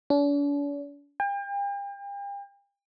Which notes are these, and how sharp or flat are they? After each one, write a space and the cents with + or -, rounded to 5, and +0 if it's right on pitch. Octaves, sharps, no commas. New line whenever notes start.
D4 -45
G5 +40